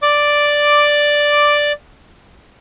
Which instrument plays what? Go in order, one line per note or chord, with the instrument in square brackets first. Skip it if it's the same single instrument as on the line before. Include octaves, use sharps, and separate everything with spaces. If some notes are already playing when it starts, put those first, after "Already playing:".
[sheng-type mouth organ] D5 D6